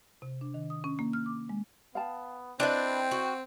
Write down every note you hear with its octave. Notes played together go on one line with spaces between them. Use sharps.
C3
D4
D#3
D#6
C#4
A#3
F6
D6
G#3
B3 F5 G5 A5
C4 D4 E4 B4 D5 D#5 G5
F#4